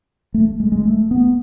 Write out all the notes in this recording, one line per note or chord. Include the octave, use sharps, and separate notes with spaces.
A3
G#3
G#3
A3
B3